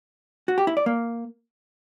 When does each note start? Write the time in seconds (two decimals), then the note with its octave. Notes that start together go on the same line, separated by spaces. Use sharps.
0.48 F#4
0.58 G4
0.67 E4
0.77 D5
0.86 A#3